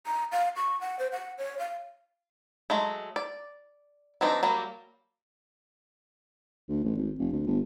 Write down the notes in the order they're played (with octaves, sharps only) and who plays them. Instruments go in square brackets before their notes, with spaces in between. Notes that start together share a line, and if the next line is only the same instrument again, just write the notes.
[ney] A#5
F5
C#6
F#5
C5
F#5
C#5
F5
[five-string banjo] F#3 G#3 A3
D5
E3 F#3 C4 D4 D#4
F#3 G3 A#3
[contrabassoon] D2
A1
G#1
F1
D2
G1